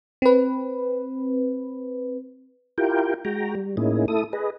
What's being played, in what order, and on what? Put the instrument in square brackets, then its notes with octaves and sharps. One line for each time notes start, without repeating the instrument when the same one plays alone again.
[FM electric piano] C4 B4
[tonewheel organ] E4 F4 G4 A#4 G5
G#3 F#4 G5 A#5
G3
A2 A#3 C#4 D#4 E4 G#4
A3 E4 A4 D#6
G#4 B4 D#5